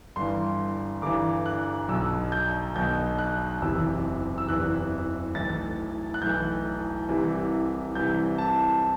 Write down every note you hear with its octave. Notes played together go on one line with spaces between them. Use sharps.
G1 G2 E3 C6
G1 G2 E3 D6
F#6
B1 B2 E6
G6
B1 B2 G6
F#6
F#1 E2 C3 E3 E6
E6
F#1 E2 C3 E3 F#6
B1 A2 E3 A6
F#6
B1 A2 E3 G6
C2 C3 E3
C2 C3 E3 G6
A5